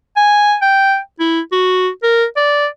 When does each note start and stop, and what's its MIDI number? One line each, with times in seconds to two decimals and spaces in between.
0.16 0.55 80
0.62 0.98 79
1.20 1.40 64
1.52 1.89 66
2.03 2.25 70
2.37 2.67 74